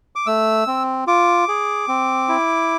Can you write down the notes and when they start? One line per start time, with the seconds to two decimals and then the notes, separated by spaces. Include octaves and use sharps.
0.16 D6
0.27 A3 E6
0.67 C4
1.07 F4 D6
1.48 G#4
1.88 C4
2.29 E4